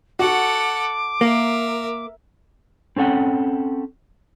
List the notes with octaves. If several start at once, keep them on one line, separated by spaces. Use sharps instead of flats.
F#4 A4 F#5 D6
A#3 A#4 E5
C4 C#4 A4 F#5 G5